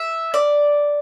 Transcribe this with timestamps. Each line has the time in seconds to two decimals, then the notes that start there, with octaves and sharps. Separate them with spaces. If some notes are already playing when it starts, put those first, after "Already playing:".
Already playing: E5
0.34 D5